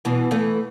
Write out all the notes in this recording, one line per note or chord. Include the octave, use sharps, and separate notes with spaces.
B2 E3
E3 A3